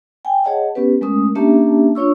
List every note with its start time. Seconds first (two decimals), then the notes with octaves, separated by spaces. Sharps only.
0.25 G5 G#5
0.44 G#4 C#5 D#5 F#5 A5
0.75 B3 C#4 G4 B4
1.01 G#3 A3 C#4 A#4 D#6
1.35 A#3 C#4 D4 G4 E5 A5
1.95 D4 F4 C#5 C#6 E6